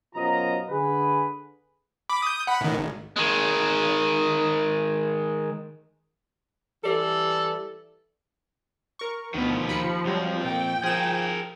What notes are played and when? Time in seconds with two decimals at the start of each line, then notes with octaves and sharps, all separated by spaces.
0.15 F#2 B2 F4 C5 D#5 A#5
0.70 D3 G#4 B4
2.10 B5 D6
2.22 D#6 G6
2.47 F#5 B5
2.61 A2 D#3
2.77 G#1
3.16 D#3 G#3
6.84 E3 G3 A4
8.99 A#4 C#6
9.34 D2 B2 D#3 F3 B4
9.68 D#2 B5 C#7
10.05 F2 F#3 G3 C4
10.45 A#2 G5
10.84 F3 G#4 A#4 E7